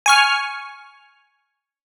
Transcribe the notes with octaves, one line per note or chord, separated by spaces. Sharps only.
G#5 C#6 F6